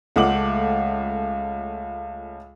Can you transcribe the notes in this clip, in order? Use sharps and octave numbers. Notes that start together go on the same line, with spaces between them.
C#2 A3 F4 F#5 D6 F#7